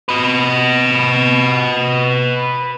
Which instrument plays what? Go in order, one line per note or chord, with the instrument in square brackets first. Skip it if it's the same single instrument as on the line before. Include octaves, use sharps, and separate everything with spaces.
[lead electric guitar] B4 D#5